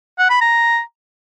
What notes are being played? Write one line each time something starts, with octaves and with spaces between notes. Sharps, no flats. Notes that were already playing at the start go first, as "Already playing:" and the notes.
F#5
B5
A#5